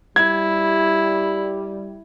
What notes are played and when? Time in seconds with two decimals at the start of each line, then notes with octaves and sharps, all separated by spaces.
0.16 G3 E4 G#6